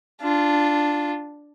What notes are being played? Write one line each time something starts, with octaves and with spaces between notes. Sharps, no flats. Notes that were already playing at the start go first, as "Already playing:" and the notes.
D4 F4